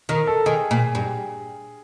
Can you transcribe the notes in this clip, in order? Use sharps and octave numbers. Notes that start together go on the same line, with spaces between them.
D#3 A#4
A4
D#3 G#4
A#2
G2